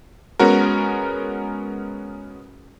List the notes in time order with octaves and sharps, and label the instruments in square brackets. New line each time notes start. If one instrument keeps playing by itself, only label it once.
[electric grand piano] G#3 B3 C#4 F#4 A#4